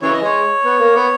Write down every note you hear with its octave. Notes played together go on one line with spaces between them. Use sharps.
C#3 E3 C#5
D#5
G#3 C#5
B3
A#3
B3